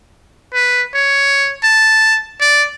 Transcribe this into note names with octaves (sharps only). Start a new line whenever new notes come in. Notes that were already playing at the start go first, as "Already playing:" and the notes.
B4
C#5
A5
D5